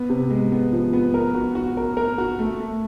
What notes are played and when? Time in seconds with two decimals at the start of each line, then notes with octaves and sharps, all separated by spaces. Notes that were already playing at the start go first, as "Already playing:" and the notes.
Already playing: B3
0.10 C3
0.31 G#3
0.52 B3
0.72 F3
0.93 B3
1.14 A#4
1.34 F#4
1.55 F#4
1.77 A#4
1.97 A#4
2.18 F#4
2.39 A3
2.60 A3